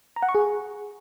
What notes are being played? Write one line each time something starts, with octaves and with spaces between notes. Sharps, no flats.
A#5
F#5
C#6
G#4